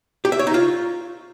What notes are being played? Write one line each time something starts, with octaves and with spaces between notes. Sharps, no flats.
G4
E5
C#5
D#4
F4